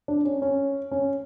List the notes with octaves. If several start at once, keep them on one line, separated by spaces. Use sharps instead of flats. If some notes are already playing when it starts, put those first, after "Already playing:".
D4
C#4
C#4
C#4